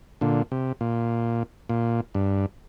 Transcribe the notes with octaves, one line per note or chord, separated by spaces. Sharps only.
A#2 D3
C3
A#2
A#2
G2